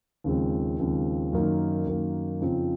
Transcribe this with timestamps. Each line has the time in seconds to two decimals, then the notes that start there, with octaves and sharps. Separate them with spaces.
0.24 D#2 C#3 F3 G#3 C4
0.79 D#2 C#3 F3 G#3 C4
1.33 F#2 D#3 A#3
1.87 F#2 D#3 A#3
2.41 F2 C#3 F3 C4 D#4